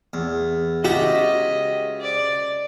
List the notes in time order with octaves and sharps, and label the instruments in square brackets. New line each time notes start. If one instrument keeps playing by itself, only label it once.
[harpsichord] E2
[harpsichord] C#2 E5 A#5 [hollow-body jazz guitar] F#4 G4 [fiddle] D#5
[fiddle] D5